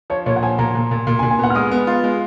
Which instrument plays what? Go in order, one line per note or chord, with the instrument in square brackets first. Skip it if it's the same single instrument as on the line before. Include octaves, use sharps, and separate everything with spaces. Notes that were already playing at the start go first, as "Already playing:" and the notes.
[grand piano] F3 [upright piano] C#5
[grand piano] A#2 [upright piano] C#5
[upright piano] F#5
[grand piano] F3 [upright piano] G#5
[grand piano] A#2 [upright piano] A#5
[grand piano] A#2
A#2
A#2
[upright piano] G#5
[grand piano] A#2
[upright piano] G#5
[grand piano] B3 [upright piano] F#5
[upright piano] F6
[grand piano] G#3 [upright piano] D#6
[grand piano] B3
F4
G#3